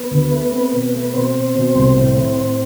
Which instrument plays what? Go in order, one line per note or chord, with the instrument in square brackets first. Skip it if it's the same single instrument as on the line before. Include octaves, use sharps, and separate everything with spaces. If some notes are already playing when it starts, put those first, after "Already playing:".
Already playing: [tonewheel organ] B3 B4
[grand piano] D2
A3
C4
B2
A3
[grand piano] B2 [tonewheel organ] C4 C5
[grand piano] B2
B2
C2
A2
A2
A2